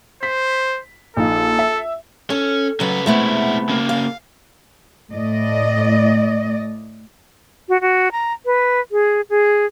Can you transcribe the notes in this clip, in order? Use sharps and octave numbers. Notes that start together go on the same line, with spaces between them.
C5 B6
A#1 D#4 A4 F5
E5
C#4 A4
C#3 F#3 B4 F#5
C3 G#3 A3 B3 E4
C#3 A#3
F5
A2 D5 D#5
F#4
F#4
A#5
B4
G#4
G#4